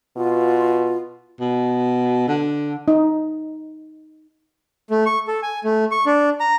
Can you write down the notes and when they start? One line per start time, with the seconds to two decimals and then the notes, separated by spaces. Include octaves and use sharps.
0.17 B2 F4
1.40 B2
2.28 D3
2.88 D#4
4.90 A3
5.06 C#6
5.28 A4
5.43 G#5
5.64 A3
5.91 C#6
6.06 D4
6.40 A#5